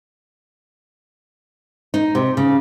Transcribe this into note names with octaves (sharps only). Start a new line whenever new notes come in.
D#4
C3
C#3